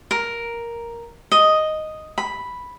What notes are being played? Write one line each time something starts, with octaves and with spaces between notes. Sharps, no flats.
A#4
D#5
B5